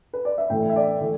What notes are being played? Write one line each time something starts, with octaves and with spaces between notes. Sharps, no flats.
B4
D5
E5
A2 E3 A3 E4 G5
E5
D5
E3 A3